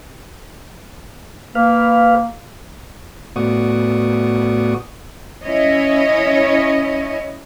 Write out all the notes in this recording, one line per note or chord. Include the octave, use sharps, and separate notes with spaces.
A#3 B4 F5
A2 B3 F#4 D5 C#6 D#6
C#4 E4 C#5 D#5